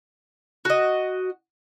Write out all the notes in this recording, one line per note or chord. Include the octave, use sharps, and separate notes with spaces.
F#4 D#5